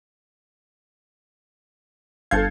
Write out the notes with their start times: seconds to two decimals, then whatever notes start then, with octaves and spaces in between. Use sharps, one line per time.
2.31 G1 A4 F5 G6 G#6